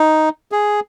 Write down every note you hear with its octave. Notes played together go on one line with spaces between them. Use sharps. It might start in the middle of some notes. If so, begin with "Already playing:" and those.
Already playing: D#4
G#4